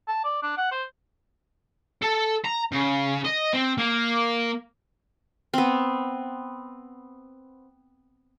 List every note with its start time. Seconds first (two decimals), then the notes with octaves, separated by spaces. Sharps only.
0.08 A5
0.24 D5
0.43 D4
0.57 F#5
0.72 C5
2.02 A4
2.45 A#5
2.72 C#3
3.25 D#5
3.54 C4
3.78 A#3
5.54 B3 C4